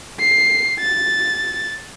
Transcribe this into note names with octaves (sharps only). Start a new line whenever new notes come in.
C7
A6